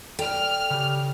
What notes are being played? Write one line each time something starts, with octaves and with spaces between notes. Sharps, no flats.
A4 D5 G5 F6
C#3 G4